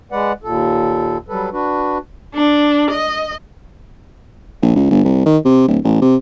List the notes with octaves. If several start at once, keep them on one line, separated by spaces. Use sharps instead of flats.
G#3 B4 D5 F#5
D#2 A#2 A4
F#3 G3 A4 B4
D4 F#4 B4
D4
D#5
A#1
C#2
G1
C2
D#3
C3
D1
A1
C3